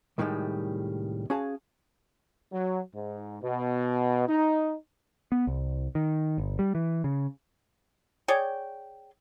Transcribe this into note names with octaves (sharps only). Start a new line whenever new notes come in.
C2 A2 D#3 F3 G3 G#3
C#4 F#4 G#4 F5 A5
F#3
G#2
B2
D#4
B3
C2
D#3
G1
G3
E3
C#3
G#4 C#5 D5 G5